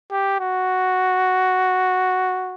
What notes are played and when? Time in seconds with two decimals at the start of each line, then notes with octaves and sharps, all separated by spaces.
0.11 G4
0.40 F#4